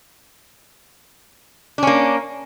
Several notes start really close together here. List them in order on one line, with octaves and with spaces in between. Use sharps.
D4 C#4 A#3